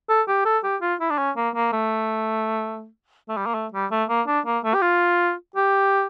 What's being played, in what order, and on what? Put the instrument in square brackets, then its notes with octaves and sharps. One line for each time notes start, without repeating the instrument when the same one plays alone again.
[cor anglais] A4
G4
A4
G4
F4
E4
D4
C#4
A#3
A#3
A3
A3
G3
A#3
A3
G3
A3
A#3
D4
A#3
A3
G4
F4
G4